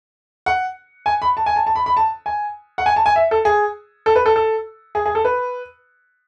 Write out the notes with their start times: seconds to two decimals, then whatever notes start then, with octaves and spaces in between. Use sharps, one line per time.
0.46 F#5
1.06 G#5
1.22 B5
1.37 A5
1.46 G#5
1.56 A5
1.67 A5
1.75 B5
1.86 B5
1.97 A5
2.26 G#5
2.78 F#5
2.86 G#5
2.96 A5
3.06 G#5
3.16 E5
3.31 A4
3.45 G#4
4.06 A4
4.16 B4
4.26 A4
4.36 A4
4.95 G#4
5.06 G#4
5.15 A4
5.25 B4